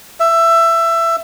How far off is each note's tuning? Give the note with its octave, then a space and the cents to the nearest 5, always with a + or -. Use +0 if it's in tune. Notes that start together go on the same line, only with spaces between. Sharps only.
E5 +20